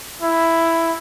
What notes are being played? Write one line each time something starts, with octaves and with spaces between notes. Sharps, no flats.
E4